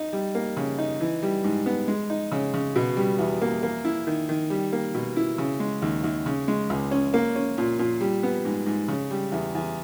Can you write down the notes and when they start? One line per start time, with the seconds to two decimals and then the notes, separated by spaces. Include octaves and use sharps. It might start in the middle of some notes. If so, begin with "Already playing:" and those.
Already playing: D#4
0.13 G3
0.35 A#3
0.57 C#3
0.78 D#4
1.01 E3
1.23 G3
1.44 G#2
1.66 B3
1.88 G#3
2.10 D#4
2.32 C#3
2.54 C#3
2.76 B2
2.97 G3
3.19 E2
3.41 A#3
3.63 A#3
3.85 E4
4.07 D#3
4.29 D#3
4.50 G3
4.73 A#3
4.95 B2
5.17 E4
5.38 C#3
5.60 G#3
5.82 D#2
6.04 D#2
6.26 C#3
6.48 G#3
6.70 C#2
6.91 C#4
7.14 A#3
7.36 C#4
7.58 A#2
7.79 A#2
8.01 G3
8.23 B3
8.45 G#2
8.66 G#2
8.88 C#3
9.11 G3
9.32 E2
9.55 E2